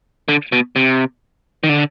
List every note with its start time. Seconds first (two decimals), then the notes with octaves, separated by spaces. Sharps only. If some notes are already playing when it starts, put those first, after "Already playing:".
0.28 D3
0.52 B2
0.76 C3
1.63 D#3
1.69 D3